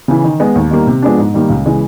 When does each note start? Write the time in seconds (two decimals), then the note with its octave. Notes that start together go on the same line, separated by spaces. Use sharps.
0.08 C#3 E3
0.24 D#3
0.40 G#3 B3
0.56 D#2
0.71 D#3 G3 A#3
0.87 C3
1.03 F3 G#3 B3 D4
1.18 G#2
1.34 D#3 G3 A#3
1.50 C#2
1.66 C#3 E3 G#3